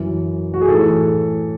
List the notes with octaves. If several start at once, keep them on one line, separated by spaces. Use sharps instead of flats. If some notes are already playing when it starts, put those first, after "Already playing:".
Already playing: F#2 E3
F#4
G#4
A2 E3 A4